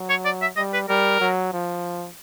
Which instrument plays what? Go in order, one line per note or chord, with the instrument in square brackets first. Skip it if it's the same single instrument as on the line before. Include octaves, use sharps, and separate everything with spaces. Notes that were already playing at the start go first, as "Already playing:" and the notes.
Already playing: [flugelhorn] F#3
[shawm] C#5
D5
E5
[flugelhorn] G3 [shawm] D#5
[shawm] B4
[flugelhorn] G3 [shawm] A#4
[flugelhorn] F#3
F3